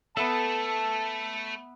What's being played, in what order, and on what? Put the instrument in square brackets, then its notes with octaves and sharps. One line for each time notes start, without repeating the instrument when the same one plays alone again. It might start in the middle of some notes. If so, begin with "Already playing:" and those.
[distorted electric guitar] A3 [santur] B3 E5 [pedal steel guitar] A4 [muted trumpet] A5